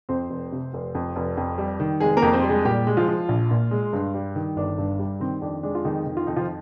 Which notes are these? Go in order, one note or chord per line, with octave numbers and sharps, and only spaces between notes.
F2 C4 C5
F1
C3
F1
F2
F1
F2
G3
D#3
F1 G#3 G#4
A#3 A#4
F2
C4 C5
G3
G#3 G#4
A#2 G3 G4
G#3
F3 F4
F3
A#1
A#2
G#3
G2
G3
D#3
G1 D4
G2
G3
D#3 C4
F2 D4
G#3 D4
F4
F2 D#3 D#4
D#3
F4
F2 D#4
F3 F4